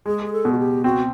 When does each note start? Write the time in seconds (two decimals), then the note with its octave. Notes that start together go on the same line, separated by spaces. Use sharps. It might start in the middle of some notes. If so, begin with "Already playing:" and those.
0.06 G#3 G#4
0.26 G#4
0.33 A4
0.45 B2
0.52 F#4
0.59 G4
0.84 C4 F#4